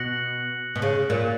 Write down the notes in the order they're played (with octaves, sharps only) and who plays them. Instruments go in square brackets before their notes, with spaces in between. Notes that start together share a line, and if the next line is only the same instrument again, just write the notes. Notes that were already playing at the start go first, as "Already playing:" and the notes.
Already playing: [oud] B2 [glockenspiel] F#6 A#6 C#7 F#7
[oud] B2
C#3
A#2